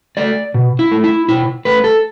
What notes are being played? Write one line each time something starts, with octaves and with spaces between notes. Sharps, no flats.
A3 D5
B2
E4
A3
E4
B2 E4
A3 B4
A4